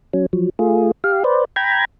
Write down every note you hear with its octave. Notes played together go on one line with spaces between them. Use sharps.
F#3 C#4
F3 F#3
A3 F4 G#4
G4 F5
B4 C5 D5
G5 A#5 B5 G#6